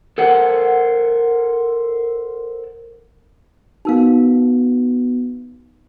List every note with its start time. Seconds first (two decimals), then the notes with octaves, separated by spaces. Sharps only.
0.18 A4 A#4 C5 F#5
3.85 B3 D#4 F#4 A#4 F5